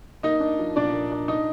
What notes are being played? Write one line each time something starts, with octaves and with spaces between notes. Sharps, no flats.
A#3 D#4 D#5
D4
F3
A#2 D4 D5
A#3
D4
D#4 D#5